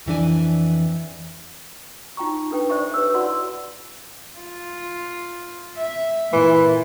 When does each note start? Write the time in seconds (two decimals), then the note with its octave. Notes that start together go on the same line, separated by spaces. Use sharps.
0.06 F2 E3 D4 G#5
2.17 D#4 F4 G5 A#5 C#6
2.51 D4 A4 B4 G5
2.70 C5 D5 E5 C#6
2.94 G4 B4 C#5 E6
3.14 E4 F#4 D5 F#5 C6
4.38 F4
5.77 E5
6.33 A#2 E3